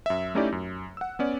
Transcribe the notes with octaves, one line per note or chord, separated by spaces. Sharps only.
F#2 E5
A3 C#4 D#4 E4 G4 D5
F#2
F#5 E6
B3 C#4 D5